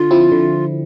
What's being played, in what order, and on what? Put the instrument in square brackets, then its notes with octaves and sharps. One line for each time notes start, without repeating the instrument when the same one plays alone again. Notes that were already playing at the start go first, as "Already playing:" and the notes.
Already playing: [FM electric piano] D3 [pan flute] F4
[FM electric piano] F3 C4 E4
D3